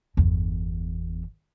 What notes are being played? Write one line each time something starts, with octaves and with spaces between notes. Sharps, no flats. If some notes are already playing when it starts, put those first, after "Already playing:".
G1 E2